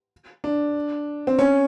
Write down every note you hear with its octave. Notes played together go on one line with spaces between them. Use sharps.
D4
C4
C#4